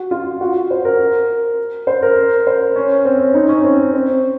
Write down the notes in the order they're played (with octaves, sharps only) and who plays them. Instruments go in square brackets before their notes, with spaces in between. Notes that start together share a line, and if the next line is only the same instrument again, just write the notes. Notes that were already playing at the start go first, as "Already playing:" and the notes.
Already playing: [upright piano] F#4
F4
F#4
C5
A#4
C5
A#4
C5
C#4
C4
C#4
D#4
C#4
C4
C4